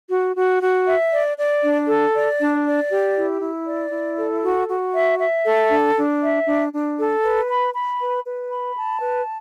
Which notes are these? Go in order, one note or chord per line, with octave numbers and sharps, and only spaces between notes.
F#4
F#4
F#4
E5
D5
D5
D4
A4
D5
D4
D5
G4
E4
E4
D5
E4
A4
F#4
F#4
E5
E5
A4
D4
D4
E5
D4
D4
A4
B4
B5
B5
B4
B4
B5
A5
B4